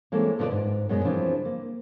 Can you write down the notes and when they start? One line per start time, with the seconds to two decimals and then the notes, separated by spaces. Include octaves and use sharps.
0.12 E3 G#3 A#3 C4 C#4 A4
0.39 B2 D3 B3 F4 B4 D5
0.51 G#2
0.89 F#2 B2 G#3
1.05 C#3 E3 F3 C4 D4
1.45 A#3